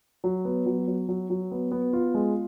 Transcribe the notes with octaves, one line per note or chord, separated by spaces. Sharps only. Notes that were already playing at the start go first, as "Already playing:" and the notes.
F#3
B3
F#3
F#3
F#3
F#3
B3
B3
F4
G#3